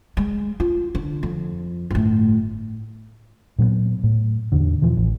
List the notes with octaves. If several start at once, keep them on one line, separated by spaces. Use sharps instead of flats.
G#3
F4
D3
F2
G1 A2
A#2 F#3 G#3 B3
A2
E2 D3
B2 E3 F3
A1